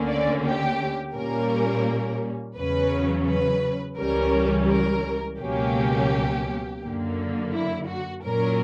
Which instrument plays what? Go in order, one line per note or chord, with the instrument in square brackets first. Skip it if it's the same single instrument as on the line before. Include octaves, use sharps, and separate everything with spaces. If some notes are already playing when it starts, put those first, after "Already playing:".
Already playing: [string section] D2 D3 A#3 C#4
D5
G4
A#2 G3 A#3 C#4 A#4
E2 C#3 F#3 C#4 B4
B4
C#2 C#3 E3 G3 C#4 A#4
A#4
C#2 B2 F#3 A#3 C#4 G4
F#2 D3 A#3
E4
F#4
A#2 F#3 C#4 A#4